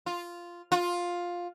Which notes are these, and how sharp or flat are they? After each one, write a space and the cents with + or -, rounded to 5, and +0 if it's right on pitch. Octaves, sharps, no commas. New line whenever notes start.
F4 -5
F4 +10